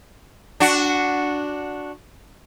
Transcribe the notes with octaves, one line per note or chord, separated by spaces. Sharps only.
D4 F#4